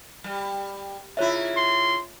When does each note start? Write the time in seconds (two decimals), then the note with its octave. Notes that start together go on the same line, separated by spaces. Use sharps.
0.24 G3
1.17 C#3 E4 F4 C#5 E5
1.57 C6